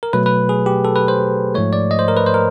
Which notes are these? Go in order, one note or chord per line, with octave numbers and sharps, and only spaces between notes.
A#4
B2 F#3 A3 B4
B4
G#4
G4
A4
B4
C5
G#2 F3 A3 C#5
D5
D#5
C5
A#4
B4
C5
A#4